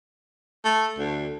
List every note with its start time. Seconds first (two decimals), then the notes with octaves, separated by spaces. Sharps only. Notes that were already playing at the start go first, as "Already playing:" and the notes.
0.65 A3
0.99 D2